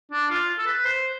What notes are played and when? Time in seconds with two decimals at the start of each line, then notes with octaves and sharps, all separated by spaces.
0.12 D4
0.30 F4
0.59 A4
0.66 B4
0.85 C5